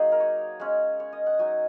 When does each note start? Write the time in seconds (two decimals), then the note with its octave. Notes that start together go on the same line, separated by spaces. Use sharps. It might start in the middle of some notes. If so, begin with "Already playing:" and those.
Already playing: F#3 A#3 D#4 G#4
0.12 A#4
0.20 C#5
0.60 G#3 C#4
1.00 C#5
1.13 D#5
1.26 F#5
1.39 F#3 D#4 G#5